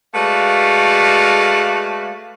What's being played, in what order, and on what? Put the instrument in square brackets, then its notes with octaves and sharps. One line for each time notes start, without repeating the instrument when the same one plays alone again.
[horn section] G#3 A3 F#4 B4 D5 F5